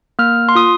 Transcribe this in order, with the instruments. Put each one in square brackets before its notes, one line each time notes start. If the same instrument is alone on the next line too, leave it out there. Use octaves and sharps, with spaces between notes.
[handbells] A#3 F6
C6
F4 D#6